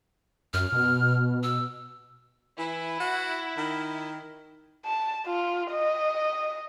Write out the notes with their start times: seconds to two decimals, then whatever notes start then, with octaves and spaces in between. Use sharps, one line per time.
0.54 F#2 F6
0.72 B2
1.43 E6
2.59 E3 E4
3.00 F#4
3.57 D#3
4.86 A5
5.27 F4
5.72 D#5